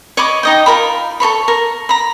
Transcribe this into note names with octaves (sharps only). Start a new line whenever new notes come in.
C#5 D#5 B5 D6
D#4 D#5 G5
F4 A4 A#4 B5
A4 A#4 C#5 B5
A#4
A#5 B5